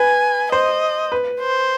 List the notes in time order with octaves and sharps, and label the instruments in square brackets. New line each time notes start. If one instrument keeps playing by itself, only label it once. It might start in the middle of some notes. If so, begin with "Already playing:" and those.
Already playing: [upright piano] B4 [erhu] G#5
[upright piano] C5 [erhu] D#5
[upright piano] B4
[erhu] C5